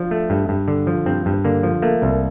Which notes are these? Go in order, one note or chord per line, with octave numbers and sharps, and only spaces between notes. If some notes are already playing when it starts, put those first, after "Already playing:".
Already playing: F3 D4
A3
G2
G2
D3
F3
G2 C4
G2
D3 A#3
F3
A3 A#3
C2